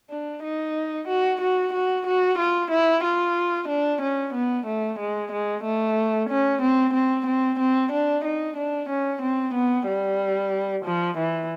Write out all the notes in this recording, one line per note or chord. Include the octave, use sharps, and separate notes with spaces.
D4
D#4
F#4
F#4
F#4
F#4
F4
E4
F4
D4
C#4
B3
A3
G#3
G#3
A3
C#4
C4
C4
C4
C4
D4
D#4
D4
C#4
C4
B3
G3
F3
E3